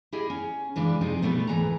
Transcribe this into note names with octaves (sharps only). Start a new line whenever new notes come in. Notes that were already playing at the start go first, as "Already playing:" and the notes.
E4 G4 G#4 D#5
C#4
C#3 E3 G#3 D4
C3 F3 C4 D#4 G#4
B2 G3 A3 B3
D2 G#2 C#3 E3 B4 A#5